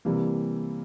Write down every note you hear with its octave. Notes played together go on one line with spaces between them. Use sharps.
C3 E3 G3 A#3